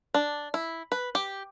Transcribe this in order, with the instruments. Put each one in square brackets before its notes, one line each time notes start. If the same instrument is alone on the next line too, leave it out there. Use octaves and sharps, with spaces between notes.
[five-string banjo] D4
E4
B4
G4